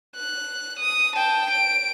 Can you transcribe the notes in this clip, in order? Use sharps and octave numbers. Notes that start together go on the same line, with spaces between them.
F#6
D#6
G5 A5
D7